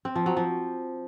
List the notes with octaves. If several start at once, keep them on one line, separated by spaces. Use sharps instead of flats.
C4
F3
F#3
F3